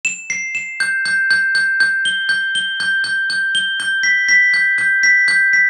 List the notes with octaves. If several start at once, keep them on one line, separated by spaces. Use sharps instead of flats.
E7
C7
E7
G6
G6
G6
G6
G6
G7
G6
G7
G6
G6
G6
G7
G6
B6
B6
G6
G6
B6
G6
B6